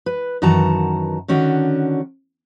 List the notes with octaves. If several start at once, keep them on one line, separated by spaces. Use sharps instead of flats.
B4
F#2 D#3 E3 F#4 A5 A#5
D3 D#3 C#4 D4 F#4